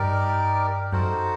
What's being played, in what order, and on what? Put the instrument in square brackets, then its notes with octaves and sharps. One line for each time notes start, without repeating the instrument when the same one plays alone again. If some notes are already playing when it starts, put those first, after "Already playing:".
Already playing: [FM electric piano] G2 [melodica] D#4 G4 A#4 D5
[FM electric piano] F#2 [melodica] D#4 F#4 A4 C5